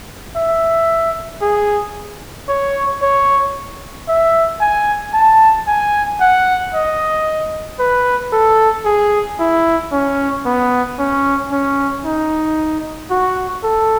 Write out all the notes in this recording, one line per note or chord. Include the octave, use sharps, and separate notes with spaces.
E5
G#4
C#5
C#5
E5
G#5
A5
G#5
F#5
D#5
B4
A4
G#4
E4
C#4
B3
C#4
C#4
D#4
F#4
A4